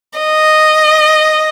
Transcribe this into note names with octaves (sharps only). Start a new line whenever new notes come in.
D#5